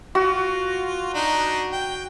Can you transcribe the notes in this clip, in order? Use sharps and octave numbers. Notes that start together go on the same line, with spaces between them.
F4 F#4
D4 D#4
G5